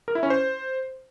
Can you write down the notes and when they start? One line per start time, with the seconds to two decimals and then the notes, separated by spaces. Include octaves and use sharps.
0.08 A#4
0.15 E4
0.23 C#4
0.30 C5